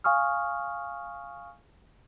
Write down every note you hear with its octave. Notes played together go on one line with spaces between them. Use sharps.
F5 G#5 C#6 D#6 F6